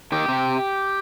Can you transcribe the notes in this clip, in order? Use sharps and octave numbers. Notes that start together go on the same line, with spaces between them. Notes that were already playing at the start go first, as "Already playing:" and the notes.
D#3 G4
C3